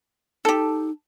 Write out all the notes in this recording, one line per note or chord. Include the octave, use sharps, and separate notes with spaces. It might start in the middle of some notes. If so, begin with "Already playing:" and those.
D#4 G4 A4